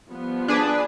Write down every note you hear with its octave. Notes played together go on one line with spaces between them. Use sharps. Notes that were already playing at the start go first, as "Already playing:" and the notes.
F3 G3 B3
D4 G#4 B4